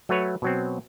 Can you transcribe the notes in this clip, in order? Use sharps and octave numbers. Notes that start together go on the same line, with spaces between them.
F#3 A3 F#4 B4 C#5
B2 F#3 C4